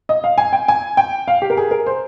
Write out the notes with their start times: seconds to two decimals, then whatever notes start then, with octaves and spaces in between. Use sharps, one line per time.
0.09 D#5
0.24 F5
0.38 G#5
0.53 G5
0.68 G#5
0.97 G5
1.28 F5
1.42 G4
1.50 A#4
1.57 G#4
1.71 A#4
1.86 C5